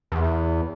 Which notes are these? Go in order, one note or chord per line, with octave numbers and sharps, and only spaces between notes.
E2